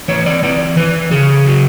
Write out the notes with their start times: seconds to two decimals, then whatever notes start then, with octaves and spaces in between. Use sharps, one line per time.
0.08 E3 C#5
0.26 D5
0.43 E3 D5
0.77 E3 B4
1.11 C#3 G#4
1.46 F#3